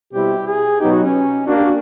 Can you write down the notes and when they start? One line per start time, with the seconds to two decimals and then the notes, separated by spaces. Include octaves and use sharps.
0.13 B2 G3 C4 E4 G4
0.47 G#4
0.80 B2 F#3 B3 D#4 G4
0.91 F#4
1.03 C#4
1.47 A#3 D4 F#4
1.56 G4
1.64 F#4